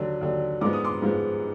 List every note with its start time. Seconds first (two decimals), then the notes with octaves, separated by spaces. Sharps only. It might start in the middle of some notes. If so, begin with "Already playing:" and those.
Already playing: D#2 D3 F#3
0.21 D#2 D3 F#3
0.61 G#2 F3 G#3 B3 D6
0.73 D#6
0.84 C6 D6
1.02 G#2 F3 G#3 B3